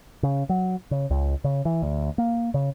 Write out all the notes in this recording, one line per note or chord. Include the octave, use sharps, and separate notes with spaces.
C#3
F#3
C#3
C#2
C#3
E3
D2
A#3
C#3